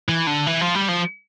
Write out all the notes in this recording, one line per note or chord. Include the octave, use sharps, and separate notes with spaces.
E3
D3
E3
F3
G3
F3